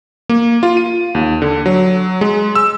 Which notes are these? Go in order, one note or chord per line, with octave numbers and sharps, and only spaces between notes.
A#3
F4
D#7
D#2
D3
F#3
G#3
E6